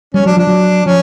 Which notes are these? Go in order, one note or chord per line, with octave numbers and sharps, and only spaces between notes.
G3 C#4
F#3 D4
F3 D4
F#3
F3 C#4